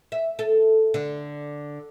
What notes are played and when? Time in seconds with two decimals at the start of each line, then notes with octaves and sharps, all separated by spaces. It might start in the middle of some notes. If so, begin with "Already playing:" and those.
0.12 E5
0.39 A4
0.94 D3